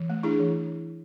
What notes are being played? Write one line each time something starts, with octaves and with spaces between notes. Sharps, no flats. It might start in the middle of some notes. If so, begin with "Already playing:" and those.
Already playing: E3
A3
D4 E4 G#4
E3